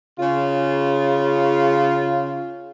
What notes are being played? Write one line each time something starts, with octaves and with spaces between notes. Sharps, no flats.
C#3 F4